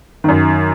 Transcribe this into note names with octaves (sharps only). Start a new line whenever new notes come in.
F#2 D#3